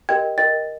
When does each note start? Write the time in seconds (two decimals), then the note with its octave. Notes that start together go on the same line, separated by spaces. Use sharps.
0.09 G4 A#4 D#5 G5 G#6
0.38 A#4 D#5 G5 A6